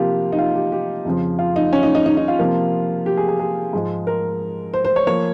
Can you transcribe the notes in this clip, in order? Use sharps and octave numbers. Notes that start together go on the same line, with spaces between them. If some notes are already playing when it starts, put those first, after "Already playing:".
Already playing: C3 F3 A#3 F4 G4
D#4
F4
G4
G4
F2 C#3 F3
F4
D#4
C#4
D#4
D#4
D#4
D#4
F4
C3 F3 A#3
G4
G#4
G#4
G#4
G#2 F3 G#3
A#4
C5
C5
C#5
F3 A#3 C#5